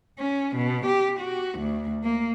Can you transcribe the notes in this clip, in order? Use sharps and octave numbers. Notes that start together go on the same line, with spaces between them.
C#4
B2
G4
F#4
D2
A#3